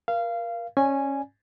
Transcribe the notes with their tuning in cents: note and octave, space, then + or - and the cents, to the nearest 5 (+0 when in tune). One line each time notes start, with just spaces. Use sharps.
A#4 +25 F5 -20
C#4 -15 D5 +0 G#5 +0